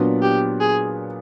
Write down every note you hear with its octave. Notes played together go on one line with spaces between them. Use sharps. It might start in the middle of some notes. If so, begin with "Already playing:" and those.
Already playing: A#2 F#3 B3 D4
G4
G#4